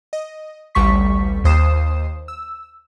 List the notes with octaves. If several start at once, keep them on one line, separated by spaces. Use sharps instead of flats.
D#5
A1 D2 G3 C#6 B6
D#2 C5 D#6 C7 E7
E6